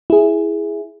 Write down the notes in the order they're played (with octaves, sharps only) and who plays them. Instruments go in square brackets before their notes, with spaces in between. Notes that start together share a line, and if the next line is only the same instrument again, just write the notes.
[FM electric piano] E4 G#4